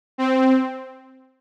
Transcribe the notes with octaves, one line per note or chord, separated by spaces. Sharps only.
C4